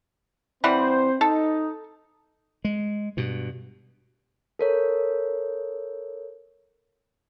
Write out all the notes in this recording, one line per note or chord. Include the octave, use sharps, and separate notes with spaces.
E3 G3 C4 C5 F#5
D#4 A4
G#3
G2 B2
A4 A#4 C#5